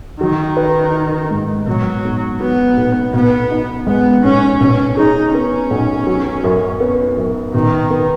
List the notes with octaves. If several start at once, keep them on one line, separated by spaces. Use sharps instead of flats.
D#3 F#3
B4
D#4
G#2
B2 F#3
B1
F#3 B3
B1
B2 B3
D#4
G#3 B3
B1 C#4
B2 C#4
D#4 G#4
B3 C#4
B1
F#3
F#2
B3
F#2
B2 D#3
B3